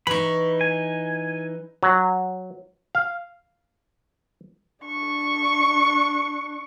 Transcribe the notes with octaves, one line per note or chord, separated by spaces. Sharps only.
E3 D#4 B5 C#6
G#5
F#3
F5
D4 C#6